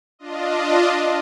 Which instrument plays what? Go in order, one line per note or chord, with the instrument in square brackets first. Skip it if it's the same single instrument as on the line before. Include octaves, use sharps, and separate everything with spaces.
[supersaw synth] D4 F4 D#5